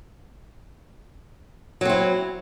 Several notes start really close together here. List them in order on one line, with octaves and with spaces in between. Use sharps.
F#3 C4 E4